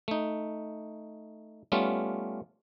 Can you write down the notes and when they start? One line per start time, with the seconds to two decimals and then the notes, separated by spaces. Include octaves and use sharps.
0.08 A3 D#4
1.72 G3 A3 B3 C#4 F4